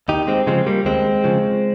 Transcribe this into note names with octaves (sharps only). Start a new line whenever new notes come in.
D#2 D#4 G4
G#3 C4
C#3 F3 G#3 C4
G3 A#3
D#2 G#3 C4
C#3 F3